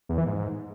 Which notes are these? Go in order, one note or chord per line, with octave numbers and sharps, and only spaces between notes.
E2
E3
G#2